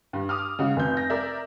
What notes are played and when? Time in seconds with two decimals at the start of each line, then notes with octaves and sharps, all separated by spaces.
0.13 G2
0.29 D6 D#6 F6
0.59 C#3 G#3 F#4
0.76 F1 G6
0.97 A#6
1.10 A#4 D5 E5